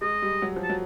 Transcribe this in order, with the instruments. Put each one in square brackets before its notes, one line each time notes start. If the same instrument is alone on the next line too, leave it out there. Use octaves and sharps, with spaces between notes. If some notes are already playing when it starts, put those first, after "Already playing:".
[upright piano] G#3 [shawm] D#5
[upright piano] G3
F#3
F3
[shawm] A5
[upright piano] F#3